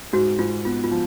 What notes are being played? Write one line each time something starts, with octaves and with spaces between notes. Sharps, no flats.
G#2 F#4
G#2 F4
B3 F4
F4
F3